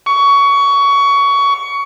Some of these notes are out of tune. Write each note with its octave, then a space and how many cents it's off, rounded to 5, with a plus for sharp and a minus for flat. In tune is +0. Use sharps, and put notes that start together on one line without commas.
C#6 +20